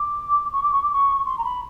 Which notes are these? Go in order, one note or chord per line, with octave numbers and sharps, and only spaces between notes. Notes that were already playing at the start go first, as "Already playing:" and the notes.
Already playing: D6
C#6
D6
C#6
D6
C#6
C6
A#5
B5